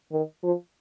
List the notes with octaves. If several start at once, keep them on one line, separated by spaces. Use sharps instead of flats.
D#3
F3